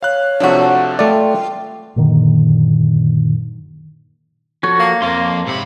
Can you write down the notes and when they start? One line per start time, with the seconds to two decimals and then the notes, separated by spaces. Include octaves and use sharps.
0.03 C#5 F5 F#6
0.40 C3 F3 A3 D4 F#4
0.99 A3 F4 D5 G5
1.96 F#1 A#2 D3 D#3
4.63 F3 F#4 A4 C#5
4.79 A#3
5.02 F2 A#3 C6 D6
5.47 G#2 C3 B5